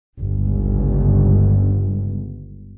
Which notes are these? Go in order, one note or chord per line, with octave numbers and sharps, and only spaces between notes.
G1 C#2